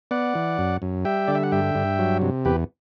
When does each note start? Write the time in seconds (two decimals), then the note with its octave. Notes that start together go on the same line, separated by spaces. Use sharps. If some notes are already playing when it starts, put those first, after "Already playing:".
0.11 B3 D5 F#5
0.35 E3
0.58 F#2
0.82 F#2
1.05 G3 E5 G5
1.28 D3 D5
1.35 E5
1.43 F#5
1.52 G2 E5 G5
1.75 G2
1.99 F#3
2.21 C3
2.45 E2 G4 B4